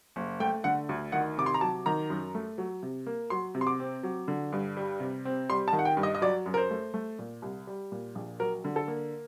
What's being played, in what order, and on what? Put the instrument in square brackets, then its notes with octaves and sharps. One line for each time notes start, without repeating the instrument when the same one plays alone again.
[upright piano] F#1
A3 G5
D3 F#5
D2
D#3 F#5
C3 D6
C6
A#5
F#3 A5
D#3 A#5
F#2
A3
F#3
C3
A#3
F#3 C6
C3
C6
D6
C4
F#3
D3
G2
G3
C3
C4
G3 C6
A5
D#3
F#5
G5
G2
D#5
D#5
F#3 D5
F#2
A#4
C5
A3
A3
A#2
C2
G3
A#2
A#1
F#3 A#4
D3
A4
A#3